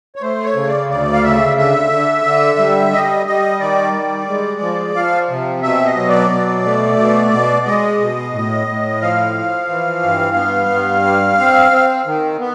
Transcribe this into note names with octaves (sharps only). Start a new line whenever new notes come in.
C#5
A3 C5
C#5
C#3
D5
D2 D5
F5
C#3 E5
D3 E5
D3
D3
G3
G3 D#5
G3 D#5
D#3 D5
G3
G#3
F3
F3 F5
C3
B2 E5
D#5
F#3
D5
B2
A3
B2
B2
G#3 D#5
B2
A2
A2
F3 F5
F3
E3
G2
B3
G2
G3
C4
C4
D#3
B3